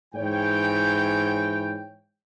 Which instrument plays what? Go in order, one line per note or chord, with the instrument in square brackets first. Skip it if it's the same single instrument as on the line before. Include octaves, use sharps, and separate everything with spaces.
[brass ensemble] G#2 E3 C#5 G5